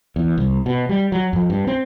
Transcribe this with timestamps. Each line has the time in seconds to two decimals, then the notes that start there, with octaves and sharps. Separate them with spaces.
0.16 E2
0.38 C2
0.66 B2
0.89 G3
1.12 F#3
1.33 F2
1.50 G2
1.67 C4